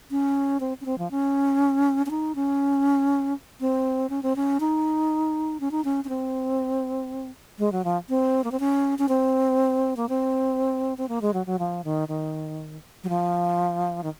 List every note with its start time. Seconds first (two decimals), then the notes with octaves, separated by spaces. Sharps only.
0.11 C#4
0.60 C4
0.81 C#4
0.86 C4
0.98 F3
1.11 C#4
2.06 C#4
2.11 D#4
2.35 C#4
3.60 C4
4.10 C#4
4.23 C4
4.36 C#4
4.60 D#4
5.60 C#4
5.71 D#4
5.85 C#4
6.05 C#4
6.09 C4
7.59 G#3
7.72 F#3
7.84 F3
8.09 C4
8.44 A#3
8.52 C4
8.60 C#4
8.99 C#4
9.09 C4
9.97 A#3
10.09 C4
10.98 C4
11.09 A#3
11.22 G#3
11.34 F#3
11.46 F#3
11.59 F3
11.84 D#3
12.08 D#3
13.04 F#3
13.09 F3
14.03 D#3